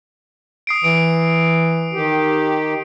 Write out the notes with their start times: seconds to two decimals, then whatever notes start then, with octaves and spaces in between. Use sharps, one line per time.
0.67 D#6 C7 D7
0.84 E3 D7
1.93 D#3 G4